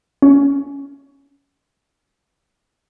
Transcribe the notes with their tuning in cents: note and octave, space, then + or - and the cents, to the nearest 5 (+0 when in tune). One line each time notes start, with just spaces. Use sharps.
C#4 +25